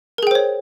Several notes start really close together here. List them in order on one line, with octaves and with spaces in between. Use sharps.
A#4 G#4 G5 C5 C#5